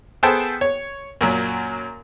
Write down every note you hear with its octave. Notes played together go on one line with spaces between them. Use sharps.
B3 G#4 A4 C5 G5 A5
C#5
F#2 A#2 F#3